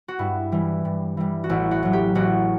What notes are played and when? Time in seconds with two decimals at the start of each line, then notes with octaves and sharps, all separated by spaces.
0.08 F#4
0.19 G2 E4
0.52 E3 G3
0.85 G2
1.17 E3 G3
1.44 F#4
1.49 A1 E4
1.71 F#4
1.83 A2 F#3
1.93 G4
2.15 A1 F#4